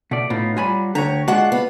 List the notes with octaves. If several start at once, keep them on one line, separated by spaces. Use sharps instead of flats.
B2 A3 D5
A2 B3 D#4 F4
F#3 G3 F4 G#5 B5
D2 D3 G4 C#5 A#5
G#3 D4 F4 F#4 F#5
B3